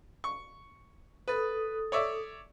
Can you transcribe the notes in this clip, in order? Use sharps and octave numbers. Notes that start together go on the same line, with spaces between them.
C#6
A4 B4 D#6
C#5 D5 E5